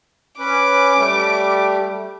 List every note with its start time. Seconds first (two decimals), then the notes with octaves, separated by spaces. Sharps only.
0.39 C#4 B4 D6
0.97 G3 A3